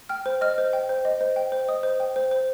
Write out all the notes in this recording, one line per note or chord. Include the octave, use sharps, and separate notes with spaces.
G5 F6
C5
D#5 F6
C5
G5
C5
D#5
C5
G5
C5
D#5 D#6
C5
G5
C5
C5